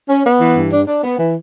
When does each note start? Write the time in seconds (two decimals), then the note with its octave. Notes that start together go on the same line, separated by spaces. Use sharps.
0.09 C#4
0.25 B3
0.41 E3
0.57 G2
0.72 D4
0.87 D4
1.04 B3
1.19 E3